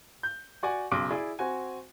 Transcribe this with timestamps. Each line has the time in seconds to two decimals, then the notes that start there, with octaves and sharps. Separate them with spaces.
0.23 G6
0.63 F#4 D5 F#5 G#5
0.91 B1 C#3 C6 D6 D7
1.10 E4 G#4 D5
1.39 C4 F#4 G#5